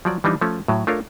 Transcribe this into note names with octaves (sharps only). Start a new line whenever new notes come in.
F3 F#3 D5
E3 F3 G3 D4 D#4
F3 A3 C#4
A2 F#3
A3 D4 F4 A#4 C#5